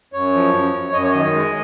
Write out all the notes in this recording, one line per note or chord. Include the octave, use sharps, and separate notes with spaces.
F#2 C#5
F3
F#2
F#2
F#2 D#5
C#5
D#3 D#5
G#3